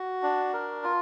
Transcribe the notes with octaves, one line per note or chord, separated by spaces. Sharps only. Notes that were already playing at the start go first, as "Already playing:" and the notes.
Already playing: F#4
D4
A#4
F4